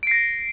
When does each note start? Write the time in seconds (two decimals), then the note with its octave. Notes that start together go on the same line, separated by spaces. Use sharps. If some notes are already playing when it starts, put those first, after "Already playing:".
0.03 D7
0.07 C7
0.11 A#6